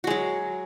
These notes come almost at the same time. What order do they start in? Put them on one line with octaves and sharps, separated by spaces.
F#4 G#3 F#3